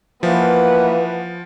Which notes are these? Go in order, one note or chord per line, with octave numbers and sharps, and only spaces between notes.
E3 F3 A#3 B4 F#5